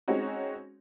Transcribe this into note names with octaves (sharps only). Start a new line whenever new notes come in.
G#3 C4 C#4 D#4 F#4